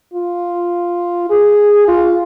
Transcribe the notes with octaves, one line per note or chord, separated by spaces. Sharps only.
F4
G#4
F4